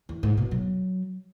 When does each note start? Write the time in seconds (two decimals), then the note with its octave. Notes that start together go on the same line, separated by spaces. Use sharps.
0.09 E2
0.23 G#2
0.37 B2
0.51 F#3